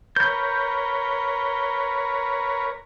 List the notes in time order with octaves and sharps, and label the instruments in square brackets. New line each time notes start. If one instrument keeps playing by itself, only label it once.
[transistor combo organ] A#4 B4 C#5 [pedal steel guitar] G6